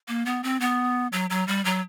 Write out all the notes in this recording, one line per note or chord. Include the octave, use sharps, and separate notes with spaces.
A#3
B3
C4
B3
F#3
F#3
G3
F#3